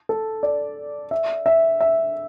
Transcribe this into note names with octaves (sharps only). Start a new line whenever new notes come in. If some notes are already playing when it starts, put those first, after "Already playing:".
A4
D5
E5
E5
E5